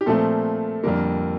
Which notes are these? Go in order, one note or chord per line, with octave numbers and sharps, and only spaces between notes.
G4
A#2 F3 A3 C4 A4
F2 D3 G3 A#3 A#4